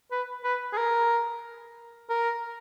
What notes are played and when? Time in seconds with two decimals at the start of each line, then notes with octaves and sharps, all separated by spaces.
0.12 B4
0.44 B4
0.73 G#4
0.78 A#4
2.10 A#4